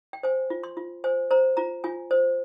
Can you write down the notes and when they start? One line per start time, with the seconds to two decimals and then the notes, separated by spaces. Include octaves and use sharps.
0.13 G5
0.23 C5 G#5
0.50 F4
0.64 C6
0.77 F4
1.04 C5 G#5
1.31 C5 A#5
1.57 F4 A#5
1.84 F4 G#5
2.11 C5